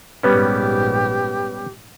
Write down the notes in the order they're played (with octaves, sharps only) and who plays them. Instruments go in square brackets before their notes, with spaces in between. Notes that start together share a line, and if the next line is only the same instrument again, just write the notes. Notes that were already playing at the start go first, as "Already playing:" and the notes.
[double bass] A#1 G#2 [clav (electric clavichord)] G3 B3 C#4 [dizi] G4 [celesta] B4